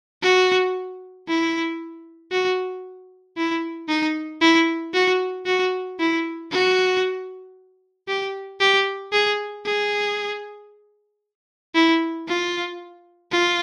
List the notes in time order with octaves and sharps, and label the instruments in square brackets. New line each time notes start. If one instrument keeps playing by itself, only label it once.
[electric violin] F#4
E4
F#4
E4
D#4
E4
F#4
F#4
E4
F#4
G4
G4
G#4
G#4
E4
F4
F4